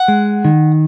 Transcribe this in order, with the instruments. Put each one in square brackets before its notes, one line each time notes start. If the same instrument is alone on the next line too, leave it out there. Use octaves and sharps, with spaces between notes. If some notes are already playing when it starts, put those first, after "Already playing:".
Already playing: [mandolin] F#5
[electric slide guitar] G#3
D#3